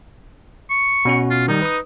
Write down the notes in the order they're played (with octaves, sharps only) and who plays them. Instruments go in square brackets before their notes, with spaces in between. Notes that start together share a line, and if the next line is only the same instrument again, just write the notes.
[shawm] C#6
[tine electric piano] B2 C#4 F#4
[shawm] F4
[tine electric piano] D#3 G3 [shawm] D#4
[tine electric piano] B4 D#6